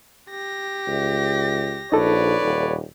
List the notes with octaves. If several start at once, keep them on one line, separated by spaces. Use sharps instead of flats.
G4 A#6
C#2
A#1 D#4 A4 B4 C#5 D5
D#1